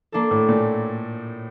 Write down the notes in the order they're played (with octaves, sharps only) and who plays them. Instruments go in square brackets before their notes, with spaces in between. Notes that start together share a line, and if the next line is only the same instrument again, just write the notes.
[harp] A#3 D4 A4
[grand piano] A2
A#2